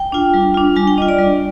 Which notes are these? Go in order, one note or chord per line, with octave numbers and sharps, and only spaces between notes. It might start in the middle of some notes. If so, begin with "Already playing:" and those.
Already playing: G5
D4 F4
G3
D4 F4
G3 G#5
G5
D4 F4 D#5
D5
G3